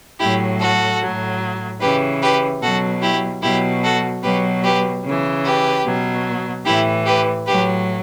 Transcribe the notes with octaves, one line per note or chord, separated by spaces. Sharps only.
A2 F#3 E4 G4
F#4 A4
A2 F#3
C#3 E3 G4 B4
G4 B4
B2 F#3 F#4 A4
E4 G4
B2 F#3 E4 G4
F#4 A4
B2 F#3 G4 B4
G4 B4
C#3 E3
G4 B4
B2 F#3
A2 E3 E4 G4
G4 B4
A2 F#3 G4 B4